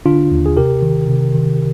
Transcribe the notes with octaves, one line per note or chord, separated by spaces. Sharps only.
D3 D4 F4
D#2
G#4
C3 G4 A#4
D#3
C3
D#3